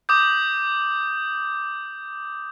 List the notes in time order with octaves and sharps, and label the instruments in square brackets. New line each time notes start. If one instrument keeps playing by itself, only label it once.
[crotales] D6 D#6 G6